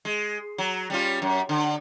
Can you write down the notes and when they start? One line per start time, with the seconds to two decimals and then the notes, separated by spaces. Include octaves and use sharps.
0.05 G#3
0.58 F#3
0.90 G3 C#4 F4
1.22 F#2
1.49 D3